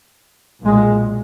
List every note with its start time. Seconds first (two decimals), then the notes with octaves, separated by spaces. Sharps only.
0.64 B1 A#2 G#3